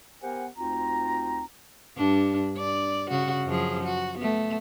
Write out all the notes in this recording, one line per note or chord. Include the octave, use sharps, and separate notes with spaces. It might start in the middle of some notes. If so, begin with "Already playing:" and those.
B3 G4 A#4 C5 F#5 G#5
D2 C4 D#4 F4 F#4 A#5
G2 D4
D5
C#3 F#4
F#2 F3 G#4
F#4
A3 B3